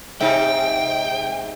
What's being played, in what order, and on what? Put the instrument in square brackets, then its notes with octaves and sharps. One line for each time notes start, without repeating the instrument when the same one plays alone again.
[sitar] G#2 C3 D#4 [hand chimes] E5 [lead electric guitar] G5